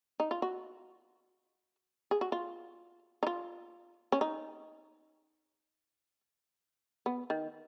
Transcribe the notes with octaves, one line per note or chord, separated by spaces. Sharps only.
D#4
F4
F#4
G#4
F#4
F4
D#4
F4
C#4
D#4
B3
D#3